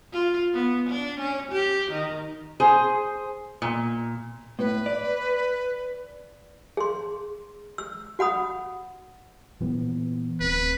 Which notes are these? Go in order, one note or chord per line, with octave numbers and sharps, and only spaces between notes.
F4
B3
D4
C#4
G4
D#3
G#4 C5
A#2
A2 B4
D5
G#4 C6
E6
F#4 F#5 B5 D#6
A#2 E3 B3
D1 C4 B4